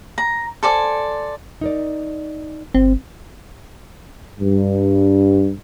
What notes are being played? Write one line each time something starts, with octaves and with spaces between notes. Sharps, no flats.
A#5
A4 C5 D5 G#5
D#4 A#4 D5
G1 C4
G2